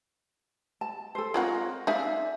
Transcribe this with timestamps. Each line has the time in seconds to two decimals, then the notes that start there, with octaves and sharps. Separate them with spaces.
0.81 A5
1.15 A4 C5
1.34 G#3 C4 F4 A#4 C#5 F#5
1.87 D#4 G#4 D5 E5 F5